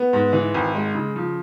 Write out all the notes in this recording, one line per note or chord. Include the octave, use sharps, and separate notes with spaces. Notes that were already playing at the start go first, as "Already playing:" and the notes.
Already playing: B3
G#2
E3
G#1
G#3
C#3
F3